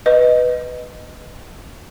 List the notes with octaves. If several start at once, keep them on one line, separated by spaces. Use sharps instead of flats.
B4 D#5